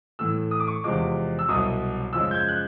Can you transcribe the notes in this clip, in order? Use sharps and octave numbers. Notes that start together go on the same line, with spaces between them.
A2 E3 A3 E6
D#6
D6
C#6
E2 C3 F3 G#3 D6
E6
C2 B2 F#3 D#6
F#2 C#3 F3 G#3 E6
G6
G#6
F#6